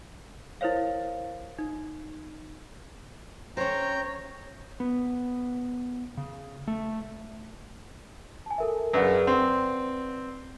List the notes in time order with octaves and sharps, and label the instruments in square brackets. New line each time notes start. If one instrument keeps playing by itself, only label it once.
[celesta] E4 A#4 C5 C#5 F5
D#4
[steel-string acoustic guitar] C#4 C5 [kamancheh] C#5 [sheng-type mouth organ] G5 A#5
[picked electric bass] B3
C#3
A3
[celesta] G#5 A5
A4 A#4 E5
[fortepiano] F#2 C#3 [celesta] B4 D5 F#5
[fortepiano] C4